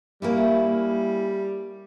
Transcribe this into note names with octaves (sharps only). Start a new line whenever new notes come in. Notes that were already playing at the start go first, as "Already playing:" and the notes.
G3 A#3 C#4 E4